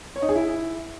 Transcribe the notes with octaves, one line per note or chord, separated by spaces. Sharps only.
C#5
D#4
G#4
E4